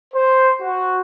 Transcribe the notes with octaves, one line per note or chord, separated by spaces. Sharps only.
C5
F#4